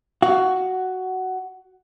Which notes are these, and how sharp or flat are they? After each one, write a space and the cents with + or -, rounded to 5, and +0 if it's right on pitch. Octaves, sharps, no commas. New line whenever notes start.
F#4 +10 F5 +15